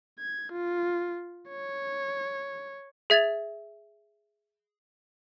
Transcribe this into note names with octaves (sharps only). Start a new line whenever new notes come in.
G#6
F4
C#5
G#4 E5 G#6 A6 F7